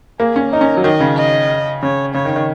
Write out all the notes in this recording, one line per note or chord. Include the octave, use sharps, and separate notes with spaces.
A#3 G#4
C#4
D#4 A#4
C#4
F#3
D#3 D#5
C#3
D#5
C#3 C#5
C#3 C#5
D#3
D#3